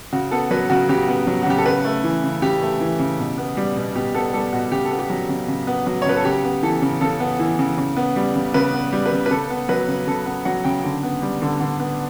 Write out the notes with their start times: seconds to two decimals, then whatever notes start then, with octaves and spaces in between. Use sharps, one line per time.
0.13 C#3 F#4
0.31 B3 A4
0.51 F#3 B4
0.70 C#3 F#4
0.89 C#3 G4
1.08 B3
1.27 F#3
1.43 F#4
1.46 C#3 G4
1.58 A4
1.66 C#3 B4
1.85 A3
2.04 E3
2.24 C#3
2.42 C#3 G4
2.61 A3
2.81 E3
2.99 C#3
3.19 B2
3.38 B3
3.57 G3
3.76 B2
3.95 B2 G4
4.14 B3 A4
4.33 G3 A4
4.53 B2 F#4
4.72 C#3 G4
4.85 A4
4.91 B3
4.99 G4
5.10 F#3
5.29 C#3
5.48 C#3
5.67 B3
5.87 F#3
6.02 C#5
6.06 C#3 B4
6.17 A4
6.25 C#3 G4
6.44 B3
6.63 E3 A4
6.82 C#3
7.01 C#3 A4
7.20 B3
7.39 E3
7.59 C#3
7.78 C#3
7.97 B3
8.16 G3
8.35 C#3
8.54 C#3 B4
8.73 B3
8.92 G3
9.06 B4
9.12 C#3
9.26 B4
9.31 C#3 A4
9.50 B3
9.69 F#3 B4
9.88 C#3
10.07 C#3 A4
10.26 B3
10.45 F#3 F#5
10.64 C#3 G5
10.84 D3
11.03 B3
11.22 G3
11.42 D3
11.61 D3
11.80 B3